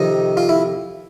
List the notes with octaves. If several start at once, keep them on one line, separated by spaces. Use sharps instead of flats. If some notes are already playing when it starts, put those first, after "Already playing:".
Already playing: F2 C3 D#3 D#4
F4
E4